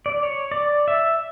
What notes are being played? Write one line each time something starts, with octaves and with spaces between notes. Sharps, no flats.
D5
C#5
D5
E5